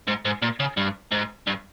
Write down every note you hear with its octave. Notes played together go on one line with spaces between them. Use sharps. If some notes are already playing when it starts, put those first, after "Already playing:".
G#2
G#2
A#2
C#3
G2
G#2
G2